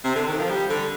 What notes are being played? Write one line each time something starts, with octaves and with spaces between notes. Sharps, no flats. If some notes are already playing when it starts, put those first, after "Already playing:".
C3
D3
D#3
F3
G3
D3